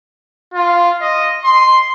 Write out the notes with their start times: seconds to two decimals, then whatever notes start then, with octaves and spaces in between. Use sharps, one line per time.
0.54 F4
1.01 D#5
1.44 C6